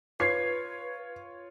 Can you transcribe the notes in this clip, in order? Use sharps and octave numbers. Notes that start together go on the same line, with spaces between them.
F4 B4 C#5 G#6 C7